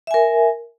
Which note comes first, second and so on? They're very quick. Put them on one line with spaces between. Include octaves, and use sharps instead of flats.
E5 G#5 A#4